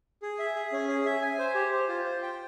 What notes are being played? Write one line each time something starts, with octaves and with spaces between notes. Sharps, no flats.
G#4
E5
G#4
C#4
G#4
E5
G#5
C5
G4
C5
F4
C5
G5